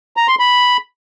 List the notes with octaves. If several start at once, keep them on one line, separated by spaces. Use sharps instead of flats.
A#5
C6
B5